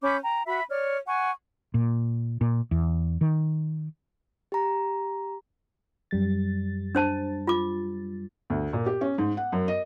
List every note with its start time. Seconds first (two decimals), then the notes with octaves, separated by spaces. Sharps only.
0.02 C#4 B5 D6 G6
0.22 G5 A#5
0.46 F#4 E5 B5
0.69 C#5 D5 F6
1.06 F#5 G#5 C#6
1.74 A#2
2.41 A#2
2.71 E2
3.21 D#3
4.52 G4 A#5
6.11 F#2 G3 A6
6.95 D4 C5 A5
7.47 F4 D6
8.50 D2
8.73 A#2
8.86 G4
9.01 C#4
9.18 G#2
9.37 F#5
9.52 F#2
9.68 D#5